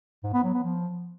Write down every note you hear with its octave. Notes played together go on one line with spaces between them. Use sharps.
G#2
B3
F#3
B3
F3